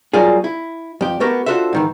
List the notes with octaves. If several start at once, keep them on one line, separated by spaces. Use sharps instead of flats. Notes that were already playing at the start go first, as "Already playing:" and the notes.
F#3 G3 A#3 F4 G#4
E4
F2 G4
A3 B3 F#4 G4 A#4
D4 F4 F#4 A4 C5 E5
G#2 D#3 E3